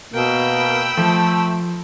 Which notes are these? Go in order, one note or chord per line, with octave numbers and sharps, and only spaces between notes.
B2 A#3 G5 B5 E6
F3 A3